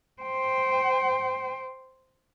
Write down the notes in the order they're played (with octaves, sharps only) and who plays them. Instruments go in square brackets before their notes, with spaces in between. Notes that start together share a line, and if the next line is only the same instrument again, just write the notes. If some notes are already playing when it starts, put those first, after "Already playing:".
[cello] C5 G5